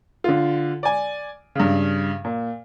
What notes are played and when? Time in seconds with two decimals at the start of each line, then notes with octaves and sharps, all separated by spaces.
0.24 D3 F4
0.83 D5 G#5
1.55 G2 C#3
2.25 A#2